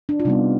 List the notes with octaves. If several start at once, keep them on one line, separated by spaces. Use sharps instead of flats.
D4
F4
C3 G3 B3 D#4